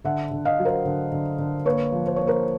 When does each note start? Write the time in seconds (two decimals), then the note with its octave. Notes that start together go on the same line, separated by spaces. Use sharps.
0.04 D3 E5 F#5
0.31 D3
0.45 D#5 F5
0.59 F#3
0.65 A#4 C5
0.85 D3
1.12 D3
1.38 D3
1.66 A#3 B4 C#5
1.92 F3
2.07 C5
2.16 A#3 C#5
2.27 A#4 C5